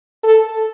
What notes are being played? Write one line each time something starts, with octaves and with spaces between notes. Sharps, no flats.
A4